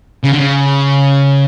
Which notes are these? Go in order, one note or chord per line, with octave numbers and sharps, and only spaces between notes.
C#3
D3
C#3